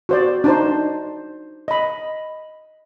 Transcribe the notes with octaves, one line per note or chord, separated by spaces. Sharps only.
F#4 C5 D5
D4 D#4 C5
D#5 B5